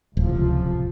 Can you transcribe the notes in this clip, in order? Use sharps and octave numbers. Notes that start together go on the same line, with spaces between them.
D1 C#2 C3 F3